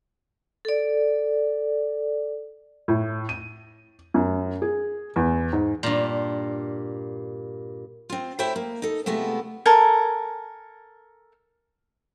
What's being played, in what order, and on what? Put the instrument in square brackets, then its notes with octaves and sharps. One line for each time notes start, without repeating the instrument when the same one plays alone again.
[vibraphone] A4 D5
[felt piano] A2
D#7
F#2
G#4
E2
G#2
[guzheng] G2 A#2
[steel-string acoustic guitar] C4 F4
A3 E4 C5 C#5 E5 G5
A#3
D#4 A4
C3 G#3 A3 B3 E4 F4
[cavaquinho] A4 A#4 G#5